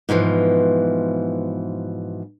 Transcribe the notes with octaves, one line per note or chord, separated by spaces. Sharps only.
G#2 B2 E3 F3